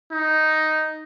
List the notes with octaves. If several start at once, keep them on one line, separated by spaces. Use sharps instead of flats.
D#4